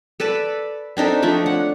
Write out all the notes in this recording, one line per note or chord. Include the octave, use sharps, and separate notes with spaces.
A4 B4 D5 A5
C4 D4 D#4 A4
F3 A3 D4 C#5
F#5